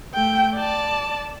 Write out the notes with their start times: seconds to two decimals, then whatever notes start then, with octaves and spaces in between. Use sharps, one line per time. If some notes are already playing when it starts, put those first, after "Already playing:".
0.14 A3 G5
0.56 D5 A5